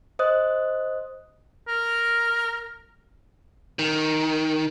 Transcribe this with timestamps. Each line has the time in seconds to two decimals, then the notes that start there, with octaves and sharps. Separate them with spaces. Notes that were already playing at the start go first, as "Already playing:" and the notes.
0.19 C5 D#5 D#6 F#6
1.68 A#4
3.79 D#3